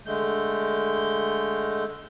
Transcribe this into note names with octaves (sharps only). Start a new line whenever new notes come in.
D3 G#3 A3 G6